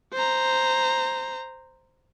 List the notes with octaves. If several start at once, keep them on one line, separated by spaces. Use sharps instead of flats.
C5 A#5